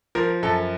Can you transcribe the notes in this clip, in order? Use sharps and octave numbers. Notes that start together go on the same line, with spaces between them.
F3 A#4
F#2 A4